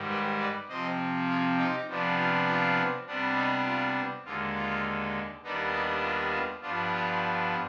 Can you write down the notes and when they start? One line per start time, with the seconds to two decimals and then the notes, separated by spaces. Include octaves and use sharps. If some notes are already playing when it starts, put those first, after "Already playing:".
Already playing: G#2 D#3 G3
0.09 G4 B4
0.39 B4 D5
0.68 C3 F3 C4 C5 D#5
1.29 F4 G#4
1.57 D#4 G4
1.88 C3 F3 B3 D4
2.17 F4
2.46 F4
3.06 C3 G3 B3 D4
3.35 D#4
3.65 F4
4.24 D#2 D3 G#3 F4
4.55 F4
5.43 D#2 D#3 G3 B3 D4 D#4
5.72 D#4 G4
6.02 F4
6.32 F4
6.62 G2 F3 B3 D4 F4
6.91 F4